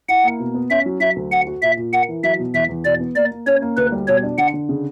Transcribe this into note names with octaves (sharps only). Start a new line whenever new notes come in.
E4 F#5
A#3
B2
B3
C#4 E5
F#3
F#3 E5
D2
F#4 F#5
F#4
A#2 E5
A#2
A#4 F#5
E3
F#3 E5
B2
E2 E5
E2
B2 D5
B3
A#3 D5
A#3
C#4 C#5
A#3
D2 B4
G3
B2 C#5
D4
D3 F#5
D3
C#3